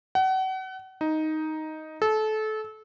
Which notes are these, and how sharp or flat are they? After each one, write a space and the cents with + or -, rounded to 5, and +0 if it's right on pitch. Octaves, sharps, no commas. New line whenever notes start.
F#5 +35
D#4 +5
A4 -25